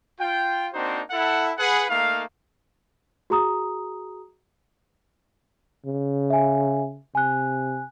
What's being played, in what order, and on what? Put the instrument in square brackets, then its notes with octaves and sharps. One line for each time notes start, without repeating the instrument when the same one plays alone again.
[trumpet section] F4 G5
A#3 C4 D4 D#4 F#4 C5
E4 A4 F#5
G#4 B4 F#5
A3 A#3 D#4 F5
[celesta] F#4 G#4 A#5 D#6
[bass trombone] C#3
[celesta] E5 G#5
[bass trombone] C3 [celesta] G#5 F#6